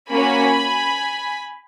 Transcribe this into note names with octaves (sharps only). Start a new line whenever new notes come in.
A#3 C#4 F#4 G#5 B5